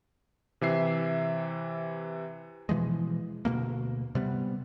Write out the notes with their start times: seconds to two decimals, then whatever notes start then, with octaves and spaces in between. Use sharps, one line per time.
0.61 C3 E3 E5 C7
2.69 B2 E3 F3 G#3
3.45 D2 B2 A3 A#3
4.15 C3 G3 B3